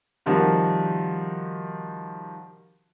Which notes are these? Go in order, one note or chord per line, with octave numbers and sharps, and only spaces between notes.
C3 D#3 F3 G3 F#4